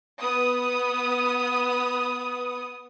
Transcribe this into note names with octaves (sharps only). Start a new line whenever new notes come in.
B3 D#6